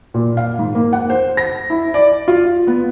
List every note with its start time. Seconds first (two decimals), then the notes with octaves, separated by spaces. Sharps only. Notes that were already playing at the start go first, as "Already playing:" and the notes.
0.14 A#2
0.37 F5
0.59 G#2
0.75 A#3
0.93 F#5
1.10 C5
1.37 A#6
1.70 E4
1.94 D5
2.28 F4
2.67 B3